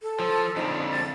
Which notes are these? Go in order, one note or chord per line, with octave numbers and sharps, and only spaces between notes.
A4
F3
F2 D3 D#4
A6